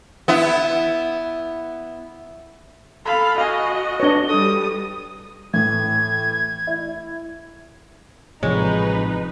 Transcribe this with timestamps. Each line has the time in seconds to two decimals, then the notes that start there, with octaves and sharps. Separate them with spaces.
0.28 B3 E4
3.06 A4 F5 B5
3.38 F#4 D#5 F5 G#5
4.00 D4 B4 C#5 A#6 G7
4.29 G3 A4 D#6
5.54 A2 E3 G#6
6.67 E4
8.43 A1 C3 F3 G#3 D#4 B4 C#5